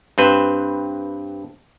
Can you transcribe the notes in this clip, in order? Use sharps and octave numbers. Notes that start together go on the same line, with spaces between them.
G2 C4 B4 C5